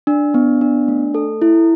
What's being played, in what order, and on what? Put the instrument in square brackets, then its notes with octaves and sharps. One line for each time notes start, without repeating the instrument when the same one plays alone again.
[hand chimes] D4
B3
D4
A3
A4
E4